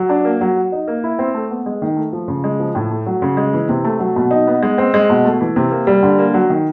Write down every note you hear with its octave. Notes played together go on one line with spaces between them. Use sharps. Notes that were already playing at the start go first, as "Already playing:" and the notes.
Already playing: F#3
D4
A#3
F#3
F#4
D#4
A#3
E4
C4
A3
B3
G#3
D#3
A3
F3
C#3
G#3
F3
A2
A3
F#3
C#3
G#3
E3
C3
A3
F#3
B2
D#4
B3
G#3
C4
G#3
B2
A3
E3
C3
A#3
G3
D3
A#3
F#3
D#3